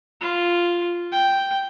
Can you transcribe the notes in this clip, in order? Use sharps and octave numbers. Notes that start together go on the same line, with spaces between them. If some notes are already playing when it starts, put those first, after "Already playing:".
F4
G5